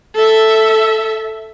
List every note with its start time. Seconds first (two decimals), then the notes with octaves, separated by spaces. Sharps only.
0.15 A4 E5